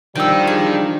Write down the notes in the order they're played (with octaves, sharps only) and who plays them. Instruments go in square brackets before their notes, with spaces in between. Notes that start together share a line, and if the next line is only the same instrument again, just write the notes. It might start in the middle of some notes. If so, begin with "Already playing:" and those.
[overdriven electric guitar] D#3 [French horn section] F3 G3 D4 [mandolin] G5 E6
[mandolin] G#4